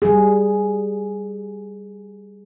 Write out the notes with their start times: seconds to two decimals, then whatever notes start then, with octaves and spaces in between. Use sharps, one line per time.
0.02 G3 G#4